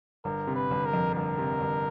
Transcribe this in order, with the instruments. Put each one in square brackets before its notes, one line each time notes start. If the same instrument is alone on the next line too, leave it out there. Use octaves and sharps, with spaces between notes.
[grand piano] G1 [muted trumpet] A#4
[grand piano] C3
[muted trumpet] B4
[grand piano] G1
[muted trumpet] A#4
[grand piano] F2
[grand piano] G1 [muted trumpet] A#4
[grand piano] C3
G1